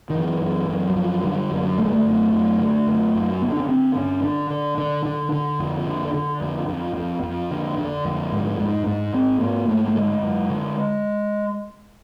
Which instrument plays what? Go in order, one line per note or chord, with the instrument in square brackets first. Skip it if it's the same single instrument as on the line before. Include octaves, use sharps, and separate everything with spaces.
[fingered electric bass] D#3
F#2 E3
F#2
F#2
F#3
F#2 F3
D3 G3
F#2
D3 A3
G#3
A3
F#2
F#2
D3
F#2
F#2
D3 B3
D4
C#4
D3 C4
G2 C#4
D3 D4
D3
D3
D3
D3
F2
D3
D3
F2
F2
F2
F2
D3
D3
F2
G#2
G#2
G#2
G#2 C4
G#2 A#3
G#2 A3
A3
D3 G#3
F#2
D3